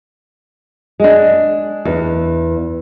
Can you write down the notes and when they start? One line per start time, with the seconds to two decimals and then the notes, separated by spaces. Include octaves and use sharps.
1.00 G#3 D4
1.85 E2